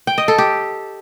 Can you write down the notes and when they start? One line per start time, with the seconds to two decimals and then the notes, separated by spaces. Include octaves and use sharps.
0.07 G5
0.18 D#5
0.28 A4
0.38 G4